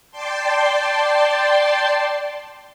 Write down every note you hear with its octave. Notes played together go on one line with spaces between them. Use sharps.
D5 G5 A5 C6